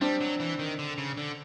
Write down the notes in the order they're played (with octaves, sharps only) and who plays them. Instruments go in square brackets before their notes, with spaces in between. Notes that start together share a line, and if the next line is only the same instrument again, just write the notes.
[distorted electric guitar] G3 [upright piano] C4 D4
[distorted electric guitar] F#3
E3
D#3
D3
C#3
D3